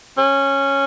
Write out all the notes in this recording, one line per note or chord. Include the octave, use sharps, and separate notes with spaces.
C#4